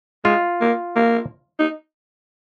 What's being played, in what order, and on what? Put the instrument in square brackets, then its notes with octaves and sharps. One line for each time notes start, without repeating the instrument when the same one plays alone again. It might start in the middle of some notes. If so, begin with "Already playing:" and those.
[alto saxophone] G#3 [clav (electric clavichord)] F4
[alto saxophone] A#3
A#3
D#4